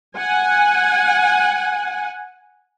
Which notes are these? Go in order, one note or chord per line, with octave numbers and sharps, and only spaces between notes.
F#5 G#5